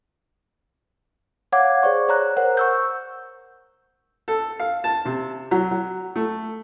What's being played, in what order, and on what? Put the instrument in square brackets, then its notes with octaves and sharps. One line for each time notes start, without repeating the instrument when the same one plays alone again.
[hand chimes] C#5 F5 F#5 D6 G#6
G#4 C5 D5 C#6
C#5 A#5 F#6
A#4 C5 F#5
C#6 E6 G6
[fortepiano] A4
F5
A5
C3
F#3
F#3
A3